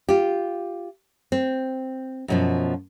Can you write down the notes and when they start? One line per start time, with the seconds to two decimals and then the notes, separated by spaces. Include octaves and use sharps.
0.09 F4 G4
1.32 C4
2.28 F#2 B2 F3